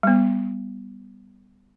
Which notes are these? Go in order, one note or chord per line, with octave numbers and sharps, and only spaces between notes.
G3 B3